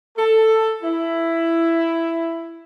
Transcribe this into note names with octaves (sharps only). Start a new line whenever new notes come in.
A4
E4